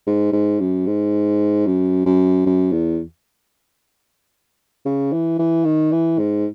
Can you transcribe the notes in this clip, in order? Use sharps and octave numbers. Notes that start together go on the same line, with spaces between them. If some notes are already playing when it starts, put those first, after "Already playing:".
G#2
G#2
F#2
G#2
F#2
F#2
F#2
E2
C#3
E3
E3
D#3
E3
G#2